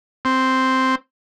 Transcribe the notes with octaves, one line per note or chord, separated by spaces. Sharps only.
C4